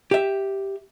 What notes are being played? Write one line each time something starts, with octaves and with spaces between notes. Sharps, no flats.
G4 E5